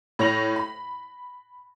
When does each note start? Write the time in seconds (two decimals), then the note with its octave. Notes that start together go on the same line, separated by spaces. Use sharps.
0.19 A2 C#5 A#6 F7 F#7
0.56 B5